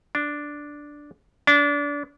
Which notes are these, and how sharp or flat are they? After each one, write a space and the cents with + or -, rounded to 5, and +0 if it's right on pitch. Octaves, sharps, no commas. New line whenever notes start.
D4 -5
D4 -30